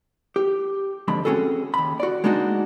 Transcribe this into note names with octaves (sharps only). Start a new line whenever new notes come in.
G4
F2 G#2 D3 B5
C4 C#4 F#4 G#4 A4
D#2 B5
F#4 D5
G#3 A#3 D4 D#4 F#4